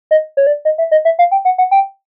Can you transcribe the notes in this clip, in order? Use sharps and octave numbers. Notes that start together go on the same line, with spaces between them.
D#5
C#5
D5
D#5
E5
D#5
E5
F5
G5
F#5
F#5
G5